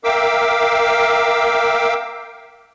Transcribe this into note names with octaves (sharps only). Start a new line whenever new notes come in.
A#4 E5 F5 G5 D6 E6